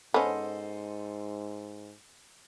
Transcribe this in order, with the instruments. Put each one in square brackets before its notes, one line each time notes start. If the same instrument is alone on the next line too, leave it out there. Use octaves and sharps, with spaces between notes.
[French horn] G#2 [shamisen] B3 C#4 [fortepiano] A4 C5 D#5